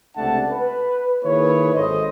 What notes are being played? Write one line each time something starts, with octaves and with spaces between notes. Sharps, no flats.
C#2 C3 A3 D4 F#5 A5
B4
D#3 A#3 E4 G#4 B4 C#5
G#1 A4 C5 D#5